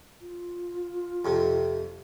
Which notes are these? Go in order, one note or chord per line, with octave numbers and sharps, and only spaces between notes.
F4
F2 C3